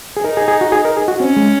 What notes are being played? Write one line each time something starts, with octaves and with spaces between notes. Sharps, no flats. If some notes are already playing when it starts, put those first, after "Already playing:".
G#4
D#4 A#4
G#4
G#4
F#4
G#4
A#4
G#4
F#4
C4 C#4
G#3